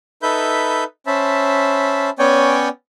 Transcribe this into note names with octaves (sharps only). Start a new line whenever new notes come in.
D#4 A4 B4 E5 B5 G6
C#4 C5 E5 A5 B5
B3 C#4 C#5 D5 G5 G#5